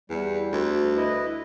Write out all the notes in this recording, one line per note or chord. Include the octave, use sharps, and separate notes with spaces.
E2 G3
D2
E4 B4 D#5